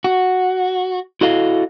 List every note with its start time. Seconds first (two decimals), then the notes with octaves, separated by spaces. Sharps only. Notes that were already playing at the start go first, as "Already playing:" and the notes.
0.04 F#4
1.21 E4 F#4 A4 D#5 F5